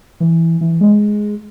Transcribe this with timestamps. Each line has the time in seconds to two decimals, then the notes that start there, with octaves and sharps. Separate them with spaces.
0.20 E3
0.61 E3
0.81 G#3